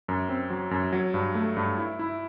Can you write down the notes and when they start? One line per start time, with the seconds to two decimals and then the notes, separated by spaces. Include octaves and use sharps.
0.08 F#2
0.29 C4
0.50 F#3
0.71 F#2
0.92 F#3
1.14 G2
1.35 A3
1.57 G2
1.78 E4
1.99 E4